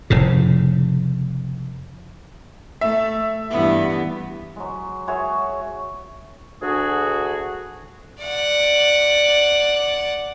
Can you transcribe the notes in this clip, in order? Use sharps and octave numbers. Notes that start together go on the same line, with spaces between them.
F1 A2 C#3
A3 E5
G2 E3 B3
F#3 G#3
F#4 G#4 C#5 E5
D2 D4 F#4 G#4
D5 F#5